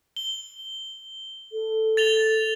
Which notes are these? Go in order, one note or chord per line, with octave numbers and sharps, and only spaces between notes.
G7
A4
A6 F7 G7